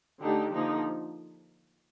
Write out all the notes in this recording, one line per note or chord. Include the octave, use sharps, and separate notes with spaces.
D3 A3 D4 D#4 G4
D3 F3 A#3 D#4